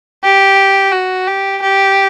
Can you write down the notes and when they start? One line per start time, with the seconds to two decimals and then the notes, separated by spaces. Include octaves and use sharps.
0.24 G4
0.92 F#4
1.27 G4
1.62 G4